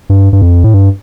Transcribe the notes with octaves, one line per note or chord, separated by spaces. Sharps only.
G2
G2
F2
A2
G2